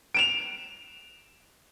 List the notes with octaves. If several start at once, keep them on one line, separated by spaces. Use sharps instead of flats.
D7 E7 F7